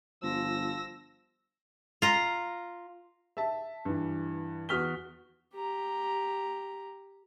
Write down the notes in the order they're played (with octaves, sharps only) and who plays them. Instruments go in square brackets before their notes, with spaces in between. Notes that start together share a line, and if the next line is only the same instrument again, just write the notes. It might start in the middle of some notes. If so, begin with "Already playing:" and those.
[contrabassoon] G1 [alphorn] F3 [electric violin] E6 A#6
[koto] F4 A#5
[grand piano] E5 A5
G2 E3
E2 F#4 D#6 F6 B6 G7
[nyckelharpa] G4 A#5